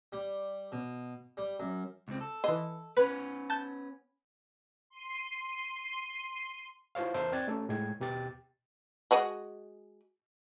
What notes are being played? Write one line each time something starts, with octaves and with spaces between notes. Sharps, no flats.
G3
B2
G3
F#2
C#2 C4
A4
E3 D#5 C6
B3 C#4 B4
A5 G6
C6 C7 D#7
E4 F4 C5 C#5 F5
E2 A#4 C5 E5 A5
C4 D5 G5 F#6 G#6 A6
A3 C#4 A4
A2 G#3 G5 G#6
D#2 B2 G4 G5 A6
G#3 F#4 D#5